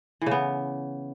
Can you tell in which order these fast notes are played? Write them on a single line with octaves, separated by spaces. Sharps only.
E3 C#3 B3